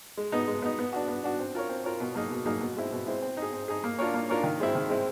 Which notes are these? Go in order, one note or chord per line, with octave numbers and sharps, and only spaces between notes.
G#3
B3 D#4
G#3
B3 D#4
B3
D4 F#4
B3
D4 F#4
C4
F4 A#4 C#5
C4
F4 A#4 C#5
B2
F#3 A#3 D#4 G#4
B2
F#3 A#3 D#4 G#4
B2
G#3 C4 E4
B2
G#3 C4 E4
C4
D#4 G#4
C4
D#4 G#4
A#3
D4 F4 A#4 C#5
A#3
D4 F4 A#4 C#5
D#3
G#3 C4 E4
D#3
G#3 C4 E4